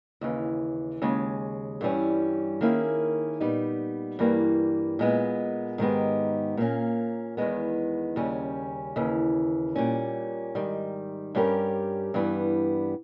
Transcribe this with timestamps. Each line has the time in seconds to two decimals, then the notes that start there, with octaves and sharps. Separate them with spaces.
0.21 D#2 C#3 E3
1.02 D#2 C#3 G#3
1.81 G2 E3 G3 C#4
2.61 D#3 A#3 C#4 E4 G#4
3.40 A#2 G3 B3 D#4
4.19 G2 E3 G3 A#3
4.99 A#2 G#3 B3
5.78 G#2 D#3 G#3 B3 G4
6.57 A#2 A#3 C#4
7.37 E2 D#3 G#3 B3
8.16 D#2 C#3 G3 C#4
8.96 D#2 C#3 E3
9.76 A#2 G3 C#4
10.55 G#2 D#3 G3
11.35 G2 G3 C#4 G4 A#4
12.14 G2 E3 G3 B3